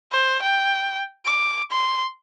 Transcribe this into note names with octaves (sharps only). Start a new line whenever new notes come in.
C5
G5
D6
C6